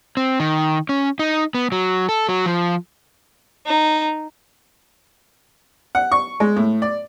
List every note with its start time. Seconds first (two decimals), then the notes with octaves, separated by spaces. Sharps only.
0.17 C4
0.40 D#3
0.89 C#4
1.19 D#4
1.55 B3
1.72 F#3
2.09 A4
2.29 F#3
2.46 F3
3.66 D#4
5.95 F#5
6.12 C#6
6.40 G#3
6.56 A2
6.82 D5